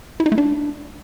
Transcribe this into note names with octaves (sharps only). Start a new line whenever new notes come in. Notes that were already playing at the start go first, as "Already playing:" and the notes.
E4
D#4
A3
D4